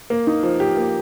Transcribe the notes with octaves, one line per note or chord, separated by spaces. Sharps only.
A#3
D#4
F3
G4
A#3